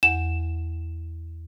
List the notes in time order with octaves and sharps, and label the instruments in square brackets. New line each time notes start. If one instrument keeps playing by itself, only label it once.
[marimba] E2 F#5 [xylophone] E7